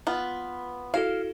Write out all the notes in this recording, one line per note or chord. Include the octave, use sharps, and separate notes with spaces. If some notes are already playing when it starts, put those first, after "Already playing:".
B3 F4 B4
E4 F#4 A4 F5